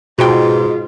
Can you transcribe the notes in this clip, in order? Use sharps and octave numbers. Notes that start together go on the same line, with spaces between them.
G#2 B2 F4 F#4 G5